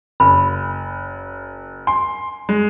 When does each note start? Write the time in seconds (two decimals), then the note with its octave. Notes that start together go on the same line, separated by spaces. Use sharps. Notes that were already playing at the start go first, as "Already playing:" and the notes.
0.20 F#1 B5
1.87 G#5 C6
2.49 G#3